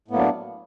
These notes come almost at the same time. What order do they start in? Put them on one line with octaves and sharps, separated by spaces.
A2 B3 A#3 F#3 D4